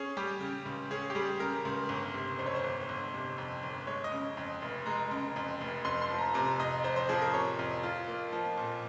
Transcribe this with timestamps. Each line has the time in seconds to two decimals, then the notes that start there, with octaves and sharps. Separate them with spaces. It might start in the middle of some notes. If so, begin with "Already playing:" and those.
Already playing: C#4 G#4
0.17 G3 G4
0.41 C#3
0.66 C#2
0.91 C#4 G#4
1.10 G4
1.15 G3 G#4
1.40 C#3 A#4
1.65 C#2
1.89 G1
2.14 C3
2.39 F2 C5
2.46 C#5
2.55 C5
2.64 G1
2.89 G1
3.14 C3
3.38 F2
3.63 G1
3.87 G#3 C#5
4.04 D#5
4.12 C#3
4.37 F2
4.62 F1
4.86 G#3 A#5
5.11 C#3
5.36 F2
5.61 F1
5.85 F2 C6
6.02 C6
6.10 F3
6.19 A#5
6.34 C3 A#5
6.59 F2 D#5
6.84 F2 C5
6.96 C5
7.09 F3 G#4
7.21 A#4
7.33 C3 C#5
7.59 F2
7.83 F4
8.08 A#3
8.33 F3
8.57 A#2